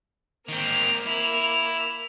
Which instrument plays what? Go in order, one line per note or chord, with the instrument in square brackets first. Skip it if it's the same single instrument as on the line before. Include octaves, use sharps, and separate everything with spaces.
[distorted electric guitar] D#3 C4 [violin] A#3 F7
[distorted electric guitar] E4